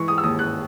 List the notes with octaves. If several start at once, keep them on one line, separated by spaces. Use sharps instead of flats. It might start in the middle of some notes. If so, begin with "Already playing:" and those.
Already playing: E3 G#3 C#6
D#6
E6
D#2 D#6
F#6